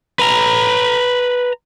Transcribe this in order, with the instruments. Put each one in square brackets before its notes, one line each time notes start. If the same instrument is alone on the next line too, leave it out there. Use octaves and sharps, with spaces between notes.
[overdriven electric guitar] B4 A#5